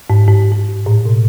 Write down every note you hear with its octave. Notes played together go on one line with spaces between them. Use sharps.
G#2
G#2
G#2
A2
B2